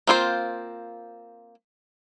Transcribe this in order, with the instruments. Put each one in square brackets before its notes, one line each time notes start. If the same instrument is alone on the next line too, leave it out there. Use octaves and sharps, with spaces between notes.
[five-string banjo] A#3 C4 F4 G#4 C5